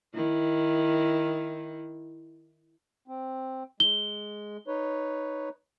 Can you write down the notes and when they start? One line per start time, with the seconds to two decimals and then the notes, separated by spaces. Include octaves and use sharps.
0.15 D#3 E4
3.08 C4
3.80 G#3 G7
4.67 D#4 B4 C#5